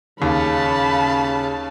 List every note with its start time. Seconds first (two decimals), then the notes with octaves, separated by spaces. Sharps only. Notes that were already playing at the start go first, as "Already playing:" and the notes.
0.22 D#2 C#3 F5 A5 B5